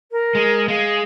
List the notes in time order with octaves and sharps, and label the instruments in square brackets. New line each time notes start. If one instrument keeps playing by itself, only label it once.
[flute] A#4
[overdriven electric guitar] G#3
[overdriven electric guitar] G#3 [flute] F5